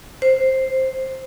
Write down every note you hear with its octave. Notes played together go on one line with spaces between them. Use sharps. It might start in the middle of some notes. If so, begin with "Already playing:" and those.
C5